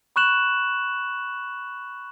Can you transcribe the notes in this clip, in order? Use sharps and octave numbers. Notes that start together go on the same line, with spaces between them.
B5 C#6 F#6 E7 F#7